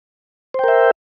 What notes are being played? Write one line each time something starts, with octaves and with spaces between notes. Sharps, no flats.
A#4 C5 E5 G5